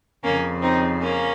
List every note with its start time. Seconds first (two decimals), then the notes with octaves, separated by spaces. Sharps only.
0.23 F2 C#3 A#3 C#4
0.61 C4 D#4
1.01 A#3 C#4